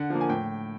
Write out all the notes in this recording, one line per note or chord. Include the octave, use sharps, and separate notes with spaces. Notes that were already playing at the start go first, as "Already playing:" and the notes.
Already playing: D3 F#5
F3 A#3
G#5
A2 G5